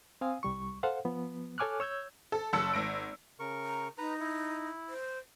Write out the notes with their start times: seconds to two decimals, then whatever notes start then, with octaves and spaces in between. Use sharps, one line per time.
0.21 C4 F5 G#5 D#6
0.43 C2 G3 C#6
0.83 A4 C5 F5 F#5
1.05 F3 B3
1.58 A4 C#5 G#5 D6 F6 F#6
1.80 C#5 E6 G6 G#6
2.32 A4
2.53 F#1 A5 E6 C#7
2.73 G#1 A#6 D7
3.39 C#3 A#4 C#6
3.65 A#5
3.98 D#4 B4 A#5
4.20 E4
4.89 C5